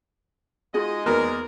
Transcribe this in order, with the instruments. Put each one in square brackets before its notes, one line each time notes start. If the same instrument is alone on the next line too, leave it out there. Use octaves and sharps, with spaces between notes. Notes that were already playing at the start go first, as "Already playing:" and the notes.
[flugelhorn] G#3 [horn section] D#4 D#5 [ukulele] F4 F#4 G#4
[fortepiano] E2 A#3 F6 [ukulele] D#4 F#4 B4 [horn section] A#4